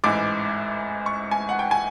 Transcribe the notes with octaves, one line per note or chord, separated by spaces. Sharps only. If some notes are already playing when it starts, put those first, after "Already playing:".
A1 G#2 E3 D6
C#6
G#5
F#5
G5
G#5